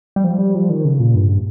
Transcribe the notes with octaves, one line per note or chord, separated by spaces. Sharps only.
G3
F3
G3
F3
D#3
C#3
A#2
G2